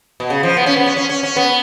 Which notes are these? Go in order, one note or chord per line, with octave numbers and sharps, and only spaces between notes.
B2
C#3
F3
B3
C#4
B3
C#4
C#4
C#4
C#4
B3